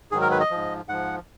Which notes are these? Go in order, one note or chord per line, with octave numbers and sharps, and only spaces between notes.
G#2 D#3 F#3 G#4
A#4
B4
D#5
G#2 F3
G#2 F3 F#5